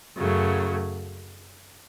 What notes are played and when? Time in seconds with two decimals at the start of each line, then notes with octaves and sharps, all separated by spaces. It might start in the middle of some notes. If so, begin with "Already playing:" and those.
0.16 F#2 C#3 F#3 A3